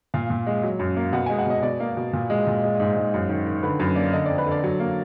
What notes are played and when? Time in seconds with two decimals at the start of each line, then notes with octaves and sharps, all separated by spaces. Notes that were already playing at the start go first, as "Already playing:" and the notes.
0.14 A#2 F5
0.30 A#2
0.47 G#3
0.63 F#3
0.79 F#2
0.97 A#3
1.13 B2 F#5
1.26 G#3 G#5
1.38 F#5
1.47 B2 D#5
1.63 B2 D5
1.80 A#3
1.97 B2
2.13 A#2
2.30 G#3
2.47 A#2
2.63 G#3
2.80 G#2
2.96 G#2
3.14 F#2
3.29 D#3
3.46 D#3
3.63 D3 B4
3.80 F#2 B4
3.96 A#3 D5
4.13 D3 D#5
4.26 F2 D5
4.38 B4
4.46 D3
4.51 D5
4.64 F#3
4.80 A#3